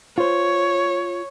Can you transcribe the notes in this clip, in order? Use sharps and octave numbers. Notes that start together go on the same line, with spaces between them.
F4 C5 C#5